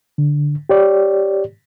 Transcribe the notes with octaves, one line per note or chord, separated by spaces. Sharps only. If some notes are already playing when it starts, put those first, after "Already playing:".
D3
G4 C#5 D5